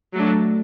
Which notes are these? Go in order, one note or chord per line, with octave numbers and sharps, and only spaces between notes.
F#3 A3 D4